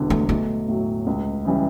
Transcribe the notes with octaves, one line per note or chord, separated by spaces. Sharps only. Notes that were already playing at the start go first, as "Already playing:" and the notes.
Already playing: E1 E2 D3
A3
B1 A3
A2 F#3
C#2
C#3 E3 G3